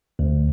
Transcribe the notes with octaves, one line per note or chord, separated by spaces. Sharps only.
D2